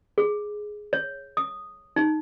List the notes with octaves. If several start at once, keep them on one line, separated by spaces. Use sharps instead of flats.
G#4
C#5
D#6
D#4